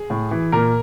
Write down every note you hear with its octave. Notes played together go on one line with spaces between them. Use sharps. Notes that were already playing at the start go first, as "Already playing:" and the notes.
Already playing: G#4
A2
E3
A#2 A#4